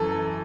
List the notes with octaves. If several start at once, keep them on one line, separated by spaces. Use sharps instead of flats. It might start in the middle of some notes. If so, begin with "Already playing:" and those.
Already playing: F#2 E3 A4
A4